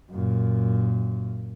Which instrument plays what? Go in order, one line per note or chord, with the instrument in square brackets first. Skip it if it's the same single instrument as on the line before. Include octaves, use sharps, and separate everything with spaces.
[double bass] F#2 A#2